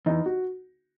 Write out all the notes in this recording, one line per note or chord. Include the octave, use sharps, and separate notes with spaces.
E2 D#4
F#4